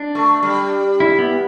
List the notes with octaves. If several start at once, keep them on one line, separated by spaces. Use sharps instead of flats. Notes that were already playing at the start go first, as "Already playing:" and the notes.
Already playing: D4
A3
G3
E4
B3